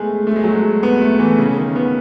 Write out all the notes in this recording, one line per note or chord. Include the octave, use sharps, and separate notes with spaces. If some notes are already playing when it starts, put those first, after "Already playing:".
Already playing: G#3 A3 B3
A3
G#3
F#3
G#3
B3
A3
E3
C#3
D#3
B3